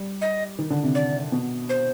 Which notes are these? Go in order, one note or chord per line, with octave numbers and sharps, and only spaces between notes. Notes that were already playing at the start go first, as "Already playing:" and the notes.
Already playing: G3
D#5
D#3
D3
C3
D5
B2
C5